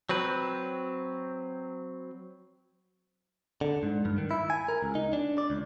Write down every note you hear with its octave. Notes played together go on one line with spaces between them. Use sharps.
F#3 C4 B4
D3
G#2
G2
D#3
E4
G#5
A#4
C#2
D#4
D4
D5
C#2